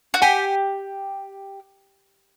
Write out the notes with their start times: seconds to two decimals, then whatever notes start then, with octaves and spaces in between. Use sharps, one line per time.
0.14 F#4
0.22 G4 F#5 G#5